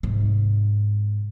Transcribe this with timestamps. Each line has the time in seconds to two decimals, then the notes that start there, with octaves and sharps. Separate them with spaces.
0.03 G#2 C3